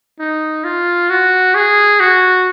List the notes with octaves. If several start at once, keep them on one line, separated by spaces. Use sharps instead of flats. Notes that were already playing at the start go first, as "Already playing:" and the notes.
D#4
F4
F#4
G#4
F#4